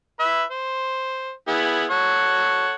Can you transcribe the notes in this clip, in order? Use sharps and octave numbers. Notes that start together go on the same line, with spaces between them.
B4 E5
C5
B3 E4 G#4
A4 C#5 F#5